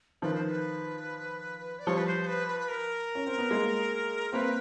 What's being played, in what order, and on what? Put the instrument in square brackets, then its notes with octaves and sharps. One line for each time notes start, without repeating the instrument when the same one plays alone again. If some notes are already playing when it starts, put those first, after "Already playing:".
[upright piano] D#3 F3 [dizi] B4
[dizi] C5
B4
D5
[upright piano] F3 G3 [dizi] C#5
[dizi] B4
C5
B4
B4
B4
A#4
[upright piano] C#4
C4
B3
G#3 A#3
[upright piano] A#3 C4 [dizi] B4